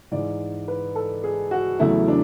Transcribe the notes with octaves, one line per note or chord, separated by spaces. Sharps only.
G#2 E3 G#3 D5
B4
A4
G#4
F#4
E2 C#3 F#3 A3 E4
D4